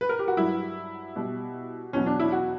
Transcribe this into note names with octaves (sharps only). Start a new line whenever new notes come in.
B4
A#4
G4
F#4
G2 F#3 E4
B2 G3
E2 B2 F#3 C#4
D4
E4
F#4